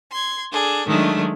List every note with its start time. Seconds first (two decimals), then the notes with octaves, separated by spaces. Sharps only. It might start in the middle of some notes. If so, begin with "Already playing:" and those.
0.11 C6 G#6
0.52 D4 G#4 A4
0.88 D#3 F#3 G#3 A3 D4